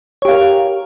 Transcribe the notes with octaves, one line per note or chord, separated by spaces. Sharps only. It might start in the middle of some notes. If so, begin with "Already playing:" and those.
G4 A#4 C#5 F5